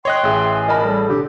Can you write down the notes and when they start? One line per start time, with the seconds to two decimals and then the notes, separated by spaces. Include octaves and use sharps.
0.05 C#5 D#5 G5 C6 F#6
0.24 A1 G#4 E5
0.52 G#5
0.68 A#4 D#5 A5 B5
0.85 G3 A4
1.09 D3 G4